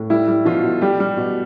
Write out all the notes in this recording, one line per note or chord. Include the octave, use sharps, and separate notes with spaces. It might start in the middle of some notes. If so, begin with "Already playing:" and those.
Already playing: A2
G3 E4
G3
B2 F3 F4
B2
G3 G4
G3
B2